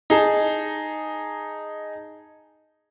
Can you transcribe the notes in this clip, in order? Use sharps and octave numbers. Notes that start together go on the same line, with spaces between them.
D#4 G#4 A5